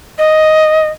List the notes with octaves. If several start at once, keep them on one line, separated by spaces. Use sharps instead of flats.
D#5